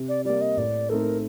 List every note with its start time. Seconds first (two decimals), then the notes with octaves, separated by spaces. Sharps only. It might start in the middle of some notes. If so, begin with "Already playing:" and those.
Already playing: C3
0.09 D5
0.25 G3 A#3 D5
0.41 D#5
0.57 A2 D5
0.89 A3 C4 D#4 A4 A#4